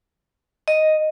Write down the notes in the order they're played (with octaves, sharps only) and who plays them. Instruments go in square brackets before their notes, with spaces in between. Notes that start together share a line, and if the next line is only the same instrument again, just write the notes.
[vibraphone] D#5